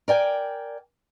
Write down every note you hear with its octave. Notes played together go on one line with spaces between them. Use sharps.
A#4 D5 G5 G#5